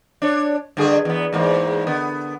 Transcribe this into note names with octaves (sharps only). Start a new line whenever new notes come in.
D4 C#5
G2 D3 G#4
E2 B3
E2 G#2 A#3
D3 B3